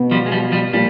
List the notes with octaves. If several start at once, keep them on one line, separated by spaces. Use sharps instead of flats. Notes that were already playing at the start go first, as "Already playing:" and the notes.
Already playing: B2
F3 G3
G#3
F3 G3
F3 G3
A#2 F3 G3